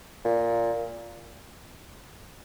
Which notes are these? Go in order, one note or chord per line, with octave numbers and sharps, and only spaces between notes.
A#2